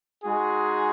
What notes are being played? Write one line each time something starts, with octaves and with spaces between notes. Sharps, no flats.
G#3 D#4 F#4 G#4 G#5